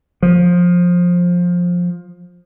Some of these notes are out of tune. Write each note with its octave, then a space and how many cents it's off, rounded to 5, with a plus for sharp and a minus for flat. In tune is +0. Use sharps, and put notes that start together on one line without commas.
F3 +15